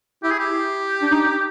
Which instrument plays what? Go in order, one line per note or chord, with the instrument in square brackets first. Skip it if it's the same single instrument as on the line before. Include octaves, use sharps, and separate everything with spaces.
[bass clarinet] E4 [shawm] G4
[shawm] G#4
G4
[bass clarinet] D4
D#4